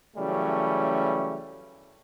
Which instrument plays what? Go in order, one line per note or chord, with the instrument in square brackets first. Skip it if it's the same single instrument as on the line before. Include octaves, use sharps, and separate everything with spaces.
[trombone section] C#3 E3 F#3 G3 A3 C#4